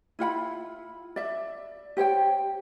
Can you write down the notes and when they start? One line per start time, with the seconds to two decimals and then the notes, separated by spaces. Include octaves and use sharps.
0.19 E4 F4 F#5 B5
1.16 D5 E5
1.97 G4 C5 C#5 G5